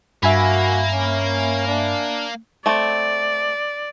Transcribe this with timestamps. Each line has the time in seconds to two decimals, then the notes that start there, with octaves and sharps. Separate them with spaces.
0.23 G2 A#3 F#4 E5 G#5 B5
0.93 C#4
1.68 D4
2.66 A3 C4 D5